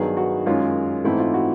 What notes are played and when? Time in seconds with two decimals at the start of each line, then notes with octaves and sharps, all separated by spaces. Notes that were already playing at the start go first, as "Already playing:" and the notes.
Already playing: G2 D#3 F#3 B3 D#4 G#4
0.17 F#4
0.46 F#2 D#3 G#3 C#4 F4
1.04 G#2 E3 A3 C4 D#4 E4
1.19 F4
1.34 F#4